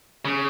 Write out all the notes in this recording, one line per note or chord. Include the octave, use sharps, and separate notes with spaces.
C#3